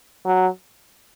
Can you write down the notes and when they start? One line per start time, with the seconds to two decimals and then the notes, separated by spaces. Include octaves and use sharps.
0.26 F#3